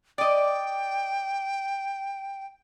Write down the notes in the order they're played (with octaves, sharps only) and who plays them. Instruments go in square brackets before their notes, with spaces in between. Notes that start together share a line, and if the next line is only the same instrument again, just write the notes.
[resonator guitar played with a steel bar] D5 D#5 [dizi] G5